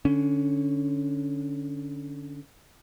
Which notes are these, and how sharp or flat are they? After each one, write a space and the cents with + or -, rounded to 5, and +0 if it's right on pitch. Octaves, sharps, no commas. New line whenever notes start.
D3 +0 C#4 +10